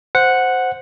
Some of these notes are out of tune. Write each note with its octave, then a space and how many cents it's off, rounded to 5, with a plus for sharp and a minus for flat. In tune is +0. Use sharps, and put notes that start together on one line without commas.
C5 -5 F#5 -5